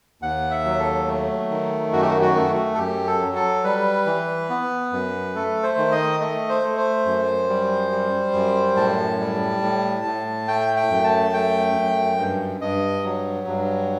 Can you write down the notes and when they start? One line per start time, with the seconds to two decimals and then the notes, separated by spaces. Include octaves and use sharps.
0.22 D#2 F#5
0.51 E5
0.65 F#3
0.79 A4
1.07 A3
1.50 D#3
1.93 F#2 F#4
2.02 G4
2.10 F#4
2.22 F#4
2.36 A3
2.74 A4
2.78 F#2 G4
3.07 A4
3.21 F#3
3.35 A4
3.64 G3 B4
4.06 E3
4.50 B3
4.92 F#2
5.35 A3 A4
5.63 C5
5.77 D#3
5.92 D#5
6.20 A3 D#5
6.49 C5
6.64 A3
6.77 C5
7.06 F#2
7.49 G3
7.91 G3
8.33 F#2
8.76 A2 A5
9.20 G3
9.62 A2
10.05 A2
10.48 A3 G5
10.76 G5
10.90 F#2
11.04 A5
11.33 A3 G5
11.76 F#2
12.18 G2
12.61 G2 D#5
13.04 F#3
13.47 G2